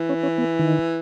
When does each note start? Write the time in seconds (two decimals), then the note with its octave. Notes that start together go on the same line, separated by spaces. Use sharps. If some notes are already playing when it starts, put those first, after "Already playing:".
Already playing: E3
0.09 C#4
0.23 C#4
0.38 B3
0.59 D#3